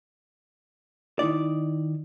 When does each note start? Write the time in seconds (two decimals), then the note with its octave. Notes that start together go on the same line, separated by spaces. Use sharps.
1.19 D#3 D#4 E4 D5